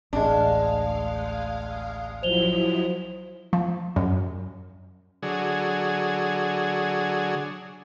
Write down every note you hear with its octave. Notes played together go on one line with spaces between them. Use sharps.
A1 D2 G#3 D4 F5
F3 F#3 E4 C5 F7 G7
F3
F#2
D3 F#3 G#4